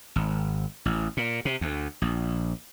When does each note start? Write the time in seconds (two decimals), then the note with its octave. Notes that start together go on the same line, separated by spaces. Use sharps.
0.16 G#1
0.86 A1
1.17 A#2
1.45 C3
1.61 D2
2.02 A#1